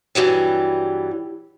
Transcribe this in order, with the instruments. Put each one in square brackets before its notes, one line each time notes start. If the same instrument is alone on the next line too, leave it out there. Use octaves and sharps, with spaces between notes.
[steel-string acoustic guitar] G2 E3 F#3 G3